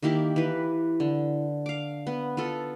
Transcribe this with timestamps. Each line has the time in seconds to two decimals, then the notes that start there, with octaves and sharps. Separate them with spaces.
0.02 D#3 A#3 E4 G4
0.36 E3 B4
1.00 D3
1.66 F5 D6
2.07 B3
2.37 B3 F4 A4